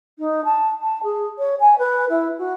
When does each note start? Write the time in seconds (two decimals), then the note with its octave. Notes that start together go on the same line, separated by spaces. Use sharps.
0.19 D#4
0.44 A5
0.81 A5
1.03 G#4
1.38 C#5
1.60 G#5
1.78 B4
2.09 E4
2.38 F#4